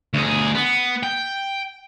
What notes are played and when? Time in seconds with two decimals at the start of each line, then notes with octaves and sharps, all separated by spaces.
0.14 D2 G#4
0.55 B3
1.03 G5